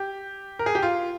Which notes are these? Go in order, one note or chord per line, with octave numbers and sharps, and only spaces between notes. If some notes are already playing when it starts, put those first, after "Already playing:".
Already playing: G4
A#4
G#4
G4
F4